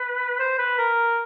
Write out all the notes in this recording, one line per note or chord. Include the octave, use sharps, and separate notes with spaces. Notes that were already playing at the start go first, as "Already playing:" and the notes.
Already playing: B4
C5
B4
A#4